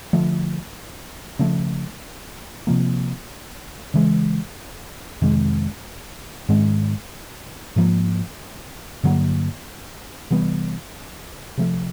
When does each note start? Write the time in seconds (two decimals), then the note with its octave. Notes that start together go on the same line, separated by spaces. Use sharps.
0.13 D3 F3 A3
1.39 C#3 F3 A3
2.67 C3 F3 A#3
3.94 C#3 E3 G#3
5.22 F2 C3 D#3 G#3
6.49 G#2 D#3 G#3 C#4
7.76 G#2 F3 A#3
9.03 G2 D3 F#3 A#3
10.31 C3 E3 G3 B3
11.58 C3 F3 A3